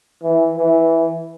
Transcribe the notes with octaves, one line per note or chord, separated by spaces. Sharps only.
E3
E3